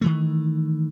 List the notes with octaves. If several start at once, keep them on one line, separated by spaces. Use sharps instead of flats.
D#3 E3 A3